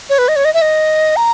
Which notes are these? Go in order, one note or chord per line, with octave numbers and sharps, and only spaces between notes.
C#5
B4
D#5
C#5
D#5
E5
D#5
A#5